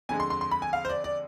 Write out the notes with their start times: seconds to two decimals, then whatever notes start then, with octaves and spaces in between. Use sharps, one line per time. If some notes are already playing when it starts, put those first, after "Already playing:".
0.09 F2 D3 G#3 G#5
0.20 C6
0.30 C6
0.41 C6
0.51 B5
0.62 G#5
0.73 F5
0.85 C5
0.89 D5
1.04 D5